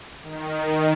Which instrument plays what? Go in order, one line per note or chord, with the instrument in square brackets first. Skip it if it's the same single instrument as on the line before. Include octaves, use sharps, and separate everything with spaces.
[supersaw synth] D#3